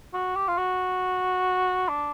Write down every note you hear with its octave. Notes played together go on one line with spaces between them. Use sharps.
F#4
G4
F4
F#4
D4